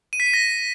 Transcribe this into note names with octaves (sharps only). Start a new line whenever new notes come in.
D#7
B6
D#7
A#6